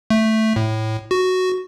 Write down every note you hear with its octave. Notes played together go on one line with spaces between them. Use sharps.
A3
A2
F#4